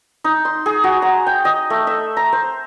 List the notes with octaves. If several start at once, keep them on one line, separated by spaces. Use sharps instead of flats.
D#4
C6
G#4
F#4
A#5
G5
D#5
A3
E5
A#5
C5